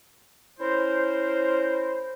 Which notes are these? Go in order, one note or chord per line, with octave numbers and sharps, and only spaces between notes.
C#4 E4 A#4 C5